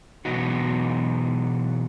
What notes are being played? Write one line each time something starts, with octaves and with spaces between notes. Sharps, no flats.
B2 E3 F#3 B3 D#4 F#4